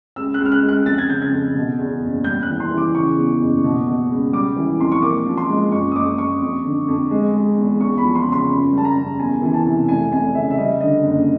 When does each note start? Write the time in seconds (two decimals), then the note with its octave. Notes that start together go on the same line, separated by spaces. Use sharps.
0.16 C#2 E6
0.34 F#6
0.40 C#2
0.45 F6
0.52 F#6
0.63 G#3
0.69 F#6
0.86 F2 A6
0.98 G#6
1.09 C#3 G6
1.22 G#6
1.32 F2
1.55 B2
1.79 E2
2.02 F#1
2.24 G3 G6
2.43 F#6
2.48 E3
2.60 C6
2.71 E3
2.77 D6
2.95 C#3 C#6
3.17 E2
3.41 F#1
3.64 B2
3.87 B2
4.10 C#2
4.33 G3 D6
4.56 E3
4.79 F2 C6
4.92 C#6
5.02 A#2 D6
5.26 F3
5.37 C6
5.49 G#3
5.71 F#1 C#6
5.91 D#6
5.95 F#1 D6
6.18 F#1 C#6
6.42 F2
6.64 D3
6.88 F2
7.11 G#3
7.34 G#3
7.57 E2
7.80 E2 C#6
7.98 B5
8.03 F3
8.15 C6
8.27 C#3
8.32 C6
8.50 F#2 B5
8.72 G3
8.77 A5
8.84 A#5
8.97 F#2
9.19 E2 G#5
9.42 E3 G#5
9.54 A5
9.65 C3
9.88 F1 G#5
10.12 F1 G#5
10.35 C#3 E5
10.50 E5
10.58 G3 D#5
10.80 D3 D#5
11.04 F#1